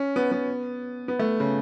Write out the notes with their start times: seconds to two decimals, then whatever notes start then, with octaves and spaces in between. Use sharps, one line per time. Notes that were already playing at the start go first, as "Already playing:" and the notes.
Already playing: C#4
0.16 B3
0.32 B3
1.08 B3
1.19 A3
1.40 C#3